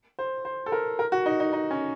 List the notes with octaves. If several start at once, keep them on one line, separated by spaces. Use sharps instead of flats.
C5
C5
A4
A#4
A#4
F#4
D#4
D#4
D#4
C#4